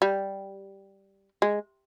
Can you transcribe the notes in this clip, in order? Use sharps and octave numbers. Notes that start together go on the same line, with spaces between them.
G3
G#3